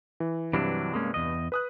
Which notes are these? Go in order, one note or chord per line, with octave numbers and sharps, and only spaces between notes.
E3
G2 C3 E3 F#3 D4
G#3 A#3 C#4
E2 D#5
B4 D#6 F#6